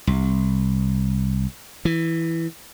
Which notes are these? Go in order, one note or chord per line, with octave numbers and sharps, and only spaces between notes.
C2
E3